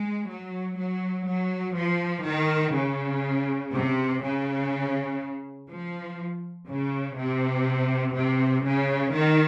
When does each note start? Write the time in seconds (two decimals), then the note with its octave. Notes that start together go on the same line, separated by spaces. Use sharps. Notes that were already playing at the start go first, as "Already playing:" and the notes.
Already playing: G#3
0.29 F#3
0.78 F#3
1.28 F#3
1.77 F3
2.26 D#3
2.76 C#3
3.74 C3
4.23 C#3
5.70 F3
6.69 C#3
7.17 C3
8.16 C3
8.65 C#3
9.14 D#3